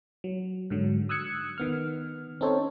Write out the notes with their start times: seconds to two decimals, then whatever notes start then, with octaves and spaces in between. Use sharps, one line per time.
0.24 F#3
0.70 G#2 D3 F#3
1.09 D#6 E6 F#6 G#6 C#7
1.58 D#3 B3 F6
2.41 C4 C#4 D#4 A4 C5 C#5